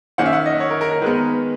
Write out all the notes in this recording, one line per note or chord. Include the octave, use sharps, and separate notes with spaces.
D#3 A#3 C#4 F#5
E5
F#5
D#5
C#5
A#4
A#4
A#4
D#3 G#3 B3 B4